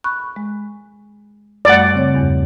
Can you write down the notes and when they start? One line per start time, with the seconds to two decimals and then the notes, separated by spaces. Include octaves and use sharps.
0.04 B5 C#6 F#6
0.36 G#3
1.65 F#2 G3 A3 D5 F#5
1.94 C#3 C4 C#5
2.14 E2 G2